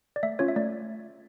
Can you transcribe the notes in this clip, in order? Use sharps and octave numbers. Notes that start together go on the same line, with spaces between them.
D5
A3 E5
C#4 F4 C#5
E5
A3 D5